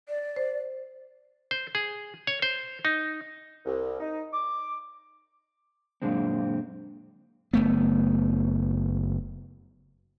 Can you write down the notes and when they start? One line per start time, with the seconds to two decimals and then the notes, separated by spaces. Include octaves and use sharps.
0.09 D5
0.36 C5
1.51 C5
1.75 G#4
2.27 C#5
2.42 C5
2.85 D#4
3.65 C2
4.00 D#4
4.32 D6
6.02 F#2 A#2 D3 G#3 C4
7.53 F#1 A3 B3